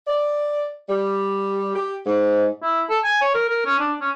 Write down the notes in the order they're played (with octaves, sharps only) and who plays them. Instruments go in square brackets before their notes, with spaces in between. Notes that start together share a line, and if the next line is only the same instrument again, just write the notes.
[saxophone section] D5
G3
G4
G#2
[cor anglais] E4
A4
G#5
C#5
A#4
A#4
C#4
D4
C#4